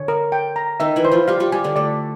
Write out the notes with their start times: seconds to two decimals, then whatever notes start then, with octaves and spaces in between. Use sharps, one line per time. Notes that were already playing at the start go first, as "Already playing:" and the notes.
Already playing: D3 C#5
0.08 A#4
0.32 G5
0.56 A#5
0.80 D#3 D#4 E5
0.96 E3 E4
1.05 C5
1.12 F3 F4
1.28 G3 G4 F5
1.40 G3 G4
1.52 G3 G4 G#5
1.64 D3 D4
1.76 A3 D5